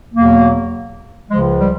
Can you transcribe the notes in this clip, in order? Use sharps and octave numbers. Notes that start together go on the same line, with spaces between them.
E2 B2 F#3 A#3
C#2 C#3 F3 G#3
G3